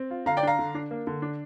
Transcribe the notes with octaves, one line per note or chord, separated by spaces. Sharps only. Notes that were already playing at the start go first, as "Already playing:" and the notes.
Already playing: C4
F4
D3 F5 A#5
D5 G5
D4 F5 A#5
D3
D4
A#3
D3
D4